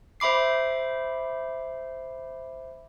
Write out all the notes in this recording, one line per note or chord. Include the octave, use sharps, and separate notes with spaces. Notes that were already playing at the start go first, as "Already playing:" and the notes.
C5 E5 B5 D6 C7